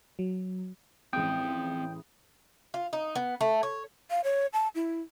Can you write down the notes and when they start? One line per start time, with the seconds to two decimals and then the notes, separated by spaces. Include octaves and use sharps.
0.19 F#3
1.13 A1 G#3 C4 F5 G5 D#6
2.74 F4
2.93 D#4
3.15 B3
3.41 A3
3.63 C#5
4.10 F5
4.24 C#5
4.53 A5
4.75 E4